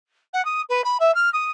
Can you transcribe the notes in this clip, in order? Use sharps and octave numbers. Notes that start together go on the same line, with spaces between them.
F#5
D#6
B4
B5
E5
F6
D#6